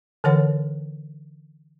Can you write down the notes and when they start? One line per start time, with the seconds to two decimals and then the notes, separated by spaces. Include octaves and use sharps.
0.24 D3 E3 A#4 C#5 F#5